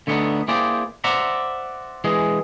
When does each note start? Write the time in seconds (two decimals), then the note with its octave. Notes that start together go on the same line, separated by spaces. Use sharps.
0.07 D3 A3 B3 C4 D4 D#4
0.48 A#3 E4 G#4 C5 D5 G5
1.04 C5 D5 E5 F#5 A#5
2.04 E3 G#3 G#4